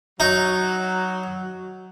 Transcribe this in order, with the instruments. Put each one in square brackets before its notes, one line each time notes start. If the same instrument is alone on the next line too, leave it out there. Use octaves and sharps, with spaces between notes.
[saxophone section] F#3 [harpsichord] D#4